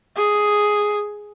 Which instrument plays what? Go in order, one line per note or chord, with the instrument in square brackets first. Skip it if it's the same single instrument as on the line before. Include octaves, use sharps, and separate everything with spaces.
[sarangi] G#4